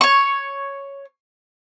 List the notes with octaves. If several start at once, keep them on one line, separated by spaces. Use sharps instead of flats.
C#5 C#6